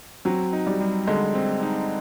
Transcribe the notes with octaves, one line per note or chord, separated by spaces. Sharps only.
F#3 C4
D#4
G3
G3
D3 G#3
C4
D#4